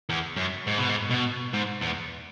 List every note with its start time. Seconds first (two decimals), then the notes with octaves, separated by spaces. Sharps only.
0.10 E2
0.37 F#2
0.67 G#2
0.78 B2
0.89 G#2
1.10 B2
1.54 G#2
1.82 E2